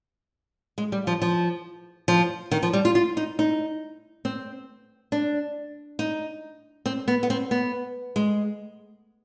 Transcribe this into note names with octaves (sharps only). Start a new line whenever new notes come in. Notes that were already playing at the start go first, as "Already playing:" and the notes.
G#3
G3
F3
F3
F3
D#3
F3
G3
F4
F4
D#4
D#4
C4
D4
D#4
C4
B3
B3
C4
B3
G#3